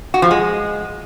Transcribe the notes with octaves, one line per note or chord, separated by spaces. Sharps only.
F#4
F3
G#3